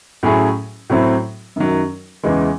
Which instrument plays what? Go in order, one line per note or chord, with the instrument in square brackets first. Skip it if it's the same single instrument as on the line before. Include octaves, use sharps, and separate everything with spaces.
[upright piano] A2 F#3 C#4 E4 G#4
A2 F#3 C4 E4
F#2 D#3 F#3
E2 C#3 E3 G#3